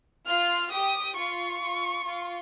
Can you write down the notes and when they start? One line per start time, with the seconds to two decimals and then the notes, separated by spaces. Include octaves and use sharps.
0.27 F4 F6
0.72 G4 D#6
1.17 F4 C#6
1.62 F4
2.06 F4